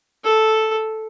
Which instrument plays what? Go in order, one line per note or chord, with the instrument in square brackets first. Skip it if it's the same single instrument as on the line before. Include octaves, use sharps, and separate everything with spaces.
[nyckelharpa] A4